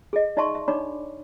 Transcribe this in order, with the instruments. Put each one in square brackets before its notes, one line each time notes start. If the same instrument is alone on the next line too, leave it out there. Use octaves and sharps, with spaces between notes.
[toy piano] G#4 A4 D#5
D#4 D5 E5 A5 C6 C#6
E5
D4 D#4 C#5 D5 B5 D6